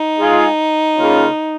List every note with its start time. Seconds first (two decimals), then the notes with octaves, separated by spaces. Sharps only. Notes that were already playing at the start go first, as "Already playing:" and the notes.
Already playing: D#4
0.17 G#3 F4 G#4
0.97 C#3 A#3 C#4 F4